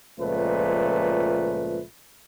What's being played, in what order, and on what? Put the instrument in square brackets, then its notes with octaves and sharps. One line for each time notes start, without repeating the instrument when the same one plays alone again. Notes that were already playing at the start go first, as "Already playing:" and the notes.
[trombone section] C#2 A#2 F3 A3 B4